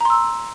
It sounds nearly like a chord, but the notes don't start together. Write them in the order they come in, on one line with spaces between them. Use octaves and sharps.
A#5 C6 E6